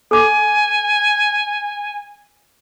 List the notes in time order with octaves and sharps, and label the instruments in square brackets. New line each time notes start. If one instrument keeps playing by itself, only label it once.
[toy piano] A4 D6 [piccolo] G#5